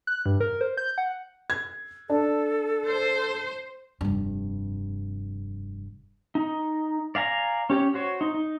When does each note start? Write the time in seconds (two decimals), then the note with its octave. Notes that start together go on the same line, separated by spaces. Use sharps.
0.07 F#6
0.26 G2
0.40 A#4
0.61 C5
0.77 G6
0.98 F#5
1.50 G#6
2.10 D4 A4
2.86 C5
4.01 F1 G2
6.35 D#4
7.15 D5 F5 G#5 A#5
7.70 C#4 G4 C#5
7.94 F#4 C5 C#5
8.21 D#4
8.34 D#4